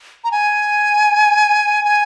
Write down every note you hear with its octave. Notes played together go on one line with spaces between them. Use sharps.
A#5
G#5
G#5